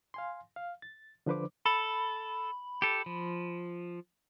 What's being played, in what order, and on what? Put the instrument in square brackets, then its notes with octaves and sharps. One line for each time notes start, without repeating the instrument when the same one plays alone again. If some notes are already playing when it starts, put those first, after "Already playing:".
[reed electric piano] F5 G#5 C6
F5
A6
D3 F3 D4 B4 C5 D6
[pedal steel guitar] A4 [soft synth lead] B5
[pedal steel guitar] G4 A4
F3